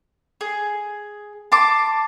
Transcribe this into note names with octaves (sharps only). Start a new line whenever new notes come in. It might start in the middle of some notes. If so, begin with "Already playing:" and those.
G#4
A5 C6 D6